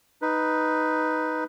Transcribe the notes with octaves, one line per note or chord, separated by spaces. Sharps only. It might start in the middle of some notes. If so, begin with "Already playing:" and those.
D#4 B4